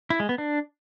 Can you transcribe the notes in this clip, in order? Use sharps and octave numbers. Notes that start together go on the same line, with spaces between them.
E4
G#3
B3
D4